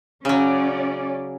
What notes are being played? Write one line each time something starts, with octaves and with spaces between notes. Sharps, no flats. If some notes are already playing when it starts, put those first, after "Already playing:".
C#3 F#3 C#4 D5